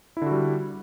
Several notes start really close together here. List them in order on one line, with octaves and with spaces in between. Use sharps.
E4 D3 F#4 G3